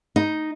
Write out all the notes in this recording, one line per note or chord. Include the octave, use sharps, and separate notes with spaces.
D#4